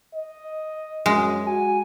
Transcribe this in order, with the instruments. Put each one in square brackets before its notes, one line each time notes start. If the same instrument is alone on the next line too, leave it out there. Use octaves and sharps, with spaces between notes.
[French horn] D#5
[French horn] F#2 [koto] G#3
[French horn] F#4 [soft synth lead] G#5